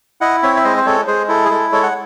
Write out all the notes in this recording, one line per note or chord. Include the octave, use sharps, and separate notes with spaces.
E4 D#5 F#5
C4 C#5 E5
E5
G#3 C5 D#5
C5
G#3 A4 C#5
G#3 G#4 C5
E4 A4
G#4
G#3 A4
G#3 A4 C#5
F#5